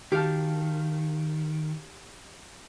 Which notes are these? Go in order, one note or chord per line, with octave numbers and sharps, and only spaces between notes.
D#3 G4 F5 A5